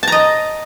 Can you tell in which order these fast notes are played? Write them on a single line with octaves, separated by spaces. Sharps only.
A5 A#5 D#5